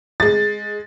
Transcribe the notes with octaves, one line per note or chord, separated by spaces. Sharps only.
G#3 A6